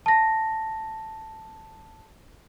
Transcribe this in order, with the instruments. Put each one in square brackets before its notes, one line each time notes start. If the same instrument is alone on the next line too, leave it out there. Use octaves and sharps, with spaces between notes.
[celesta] A5 A#6